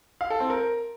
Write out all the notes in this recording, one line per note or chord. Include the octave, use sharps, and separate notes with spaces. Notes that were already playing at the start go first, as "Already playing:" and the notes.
F5
A4
C4
A#4